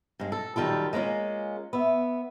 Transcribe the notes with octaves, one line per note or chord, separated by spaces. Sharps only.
G2 G#3
A4
F#2 D#3 G3 F4 A4
G#3 A#3 C#4 F4
B3 E5